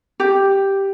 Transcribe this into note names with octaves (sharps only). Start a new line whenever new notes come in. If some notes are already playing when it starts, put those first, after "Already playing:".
G4